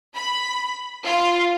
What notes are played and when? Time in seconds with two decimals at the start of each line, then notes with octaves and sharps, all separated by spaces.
0.15 B5
1.05 F4